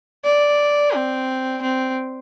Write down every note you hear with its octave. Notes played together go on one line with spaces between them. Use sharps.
D5
C4
C4